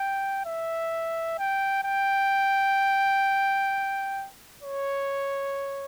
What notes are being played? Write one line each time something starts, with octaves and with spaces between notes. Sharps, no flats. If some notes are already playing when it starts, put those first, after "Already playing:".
Already playing: G5
E5
G5
G5
C#5